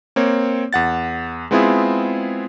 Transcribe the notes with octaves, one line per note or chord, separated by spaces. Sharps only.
A#3 C4 C#5
E2 F#5 A6
G#3 B3 C4 E4 F4 G#4